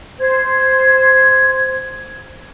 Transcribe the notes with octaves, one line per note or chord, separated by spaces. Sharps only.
C5 G#6